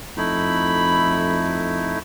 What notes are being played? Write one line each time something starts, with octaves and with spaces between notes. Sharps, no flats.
F2 A3 D#4 E4 B5